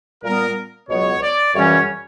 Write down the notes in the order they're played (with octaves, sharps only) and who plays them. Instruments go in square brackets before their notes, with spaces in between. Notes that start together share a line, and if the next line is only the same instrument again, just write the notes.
[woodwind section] A#2 G3 B3 [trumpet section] A#4
[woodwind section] C#2 B2 F#3 B3 [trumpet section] C#5
[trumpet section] D5
[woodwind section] F#2 C#3 E3 G3 C#4 [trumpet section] C#5